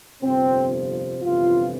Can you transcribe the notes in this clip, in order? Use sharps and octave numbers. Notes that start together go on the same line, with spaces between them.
G1 F2 C3 F3 C4
G1 F2 C3 E3 F4